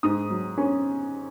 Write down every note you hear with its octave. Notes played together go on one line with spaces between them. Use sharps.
G#2 D#6
F#3
C#4